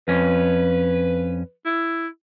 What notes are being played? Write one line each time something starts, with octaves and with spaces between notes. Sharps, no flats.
F2 C#4 B4
E4